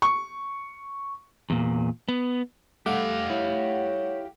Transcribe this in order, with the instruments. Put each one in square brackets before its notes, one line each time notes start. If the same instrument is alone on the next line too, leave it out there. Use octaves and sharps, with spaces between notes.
[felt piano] C#6
[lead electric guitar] E2 A#2
B3
[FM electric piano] G3 A3 F#5 [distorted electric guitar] G4 F5 [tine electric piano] D6
[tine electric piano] E4 [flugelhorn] C#5